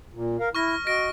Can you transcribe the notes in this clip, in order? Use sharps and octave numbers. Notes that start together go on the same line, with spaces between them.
A#2
A#4 F5
E4 C#6 F6 A#6
F#4 D#5 A#6 D7